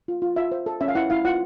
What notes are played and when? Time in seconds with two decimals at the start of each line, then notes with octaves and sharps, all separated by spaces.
0.08 F4
0.22 F4
0.36 F4 E5
0.52 C5
0.66 A4
0.81 C#4 E5
0.88 F5
0.95 E4 F#5
1.10 E4 F5
1.25 F4 F#5